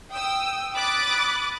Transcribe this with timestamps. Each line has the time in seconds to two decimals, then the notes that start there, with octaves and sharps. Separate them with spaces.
0.11 G5 D#6 E6
0.74 B5 D6 D#6 F#6 A6